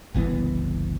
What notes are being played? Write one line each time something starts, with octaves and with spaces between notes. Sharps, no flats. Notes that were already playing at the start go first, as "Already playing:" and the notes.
F#1 C2 E3 B3